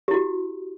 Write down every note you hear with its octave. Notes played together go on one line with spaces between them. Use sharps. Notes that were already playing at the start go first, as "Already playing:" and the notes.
E4 F#4 G4